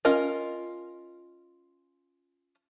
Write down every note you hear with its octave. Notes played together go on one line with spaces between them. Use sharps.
C#4 F4 A#4 D#5